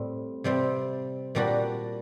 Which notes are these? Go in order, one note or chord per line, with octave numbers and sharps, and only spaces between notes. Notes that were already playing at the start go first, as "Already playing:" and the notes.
Already playing: A2 G3 C4
C3 G3 C4
A#2 G3 D4 F#4